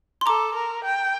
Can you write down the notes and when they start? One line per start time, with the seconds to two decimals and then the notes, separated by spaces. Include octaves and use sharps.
0.21 C6
0.26 A4 A#5 D6
0.55 A#4
0.84 G5